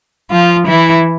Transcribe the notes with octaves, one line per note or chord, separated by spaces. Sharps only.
F3 F4
E3 E4